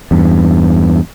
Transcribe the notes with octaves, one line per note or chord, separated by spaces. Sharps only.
E2 G2